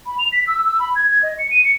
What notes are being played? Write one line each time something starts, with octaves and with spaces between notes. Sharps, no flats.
B5
F7
B6
E6
E6
B5
G#6
G#6
D#5
C#7
D#7
C#7